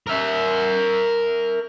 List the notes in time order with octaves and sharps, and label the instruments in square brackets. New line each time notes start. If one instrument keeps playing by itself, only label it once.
[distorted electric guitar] A#4 E5